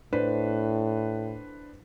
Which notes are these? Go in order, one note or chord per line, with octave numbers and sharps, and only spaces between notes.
A2 D4 B4 C5